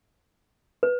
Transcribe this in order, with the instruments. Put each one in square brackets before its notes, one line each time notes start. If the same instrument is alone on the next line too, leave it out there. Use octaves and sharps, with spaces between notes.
[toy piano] B4